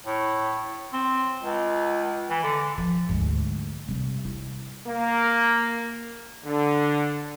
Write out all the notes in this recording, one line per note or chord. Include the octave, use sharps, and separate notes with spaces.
A2
C4
C#2
E3
D3
F3
D2 G#2
C3 G3
E4
A#3
D3